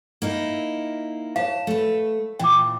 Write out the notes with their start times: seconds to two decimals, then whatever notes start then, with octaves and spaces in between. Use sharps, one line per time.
0.22 A#3 D#4 E4
1.36 C#5 F5 A5
1.67 A3 B4
2.39 A#2 E3 G5 D6